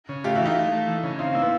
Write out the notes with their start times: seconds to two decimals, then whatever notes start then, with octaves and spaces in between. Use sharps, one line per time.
0.09 C#3
0.24 A3 F4 G4
0.35 E4 F#4
0.40 E3
0.45 D#4 F4
0.56 A3
0.72 A3
0.88 E3
1.03 C#3
1.19 C4 D#4 F4
1.33 A#3 E4
1.42 B3